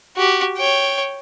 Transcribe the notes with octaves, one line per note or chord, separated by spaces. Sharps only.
F#4 G4
C#5 G5